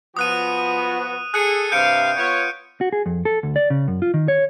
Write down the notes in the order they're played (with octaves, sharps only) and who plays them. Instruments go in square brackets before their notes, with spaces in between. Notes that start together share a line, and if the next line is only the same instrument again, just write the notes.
[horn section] F3 B3 F#4 [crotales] D#6 F#6 D#7
[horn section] G#4 A4 [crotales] F#6 C#7 D#7
[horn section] G2 C3 F5 [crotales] G6 C#7 D7
[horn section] B3 F4 C#5
[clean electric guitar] F#4
G#4
F2
A4
D2
D5
C#3
F#2
F4
D#3
C#5